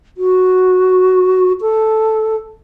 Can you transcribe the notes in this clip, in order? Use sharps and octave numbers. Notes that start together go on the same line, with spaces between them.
F#4
A4